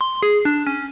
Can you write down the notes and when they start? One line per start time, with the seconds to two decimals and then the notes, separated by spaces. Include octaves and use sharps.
0.01 C6
0.23 G#4
0.45 D4
0.67 C#4